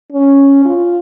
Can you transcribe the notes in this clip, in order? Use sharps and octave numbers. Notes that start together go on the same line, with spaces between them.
C#4
F4